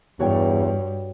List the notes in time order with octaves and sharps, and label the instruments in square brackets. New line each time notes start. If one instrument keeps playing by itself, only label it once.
[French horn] E2 [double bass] G2 [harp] F#4 C#5 G5